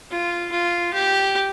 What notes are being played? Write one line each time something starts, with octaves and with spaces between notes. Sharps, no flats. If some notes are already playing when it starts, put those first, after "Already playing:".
F4
F4
G4